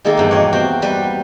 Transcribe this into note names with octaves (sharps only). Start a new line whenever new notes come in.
D#3 G#3 A#3 D#4 A4
E2 G2
B2 A#3 C#5
C4 F#4 G5
G3 B4